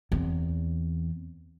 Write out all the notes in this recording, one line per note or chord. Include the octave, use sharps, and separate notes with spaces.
E2 C4